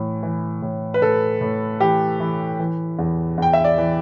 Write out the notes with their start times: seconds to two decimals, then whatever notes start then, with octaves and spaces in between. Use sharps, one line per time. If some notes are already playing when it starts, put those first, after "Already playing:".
Already playing: A2 E3
0.23 E3
0.62 A2
0.94 B4
1.01 A2 A4
1.41 A2
1.80 E3 G4
2.20 E3
2.59 E3
2.99 E2
3.38 E2 G5
3.53 E5
3.64 D5
3.78 E3